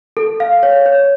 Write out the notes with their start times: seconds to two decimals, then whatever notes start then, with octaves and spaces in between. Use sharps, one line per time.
0.17 A4
0.40 F5
0.63 C#5
0.86 C#5